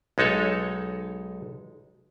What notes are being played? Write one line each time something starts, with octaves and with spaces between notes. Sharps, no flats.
B1 G#3 D#4 A4 C#5